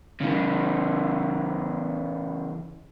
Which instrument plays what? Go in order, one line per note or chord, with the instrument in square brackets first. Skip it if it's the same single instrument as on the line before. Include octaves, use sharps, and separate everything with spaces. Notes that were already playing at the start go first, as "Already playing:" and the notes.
[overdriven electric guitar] C#3 E3